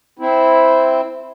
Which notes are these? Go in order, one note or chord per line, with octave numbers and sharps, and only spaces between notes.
C4 E4